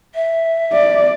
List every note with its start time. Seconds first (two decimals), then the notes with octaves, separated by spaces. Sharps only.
0.15 E5
0.73 D5